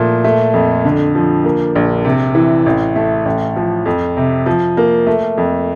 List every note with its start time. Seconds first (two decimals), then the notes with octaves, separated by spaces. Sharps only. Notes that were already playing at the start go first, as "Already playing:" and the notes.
Already playing: A#2 F3 A3
0.24 A3
0.54 F2
0.85 D3
1.15 F3
1.44 A#3
1.75 A#1
2.05 C3
2.35 E3
2.66 A1
2.96 A3
3.25 A1
3.56 F3
3.86 F2
4.17 C3
4.46 F3
4.77 A#3
5.07 A3
5.38 F2